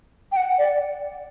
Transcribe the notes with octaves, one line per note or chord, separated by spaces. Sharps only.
G5
F#5
D5